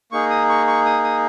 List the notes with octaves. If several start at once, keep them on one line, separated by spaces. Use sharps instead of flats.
A#3 D#4 G#4 C#6
D#6
C#6
C#6
D#6
D#6